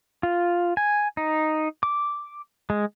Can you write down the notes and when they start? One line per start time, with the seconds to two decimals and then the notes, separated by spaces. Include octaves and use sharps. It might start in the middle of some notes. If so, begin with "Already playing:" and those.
0.23 F4
0.77 G#5
1.17 D#4
1.83 D6
2.70 G#3